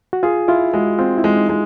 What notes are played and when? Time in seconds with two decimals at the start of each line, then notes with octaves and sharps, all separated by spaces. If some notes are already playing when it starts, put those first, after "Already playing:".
0.13 F#4
0.23 F4 G#4
0.48 E4 F4
0.73 G#3 F#4
0.98 C4 F4
1.18 E4
1.24 G#3
1.37 D#4
1.49 G#3